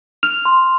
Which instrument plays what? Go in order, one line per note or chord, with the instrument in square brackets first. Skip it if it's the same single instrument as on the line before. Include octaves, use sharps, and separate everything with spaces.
[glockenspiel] F6 F7
C6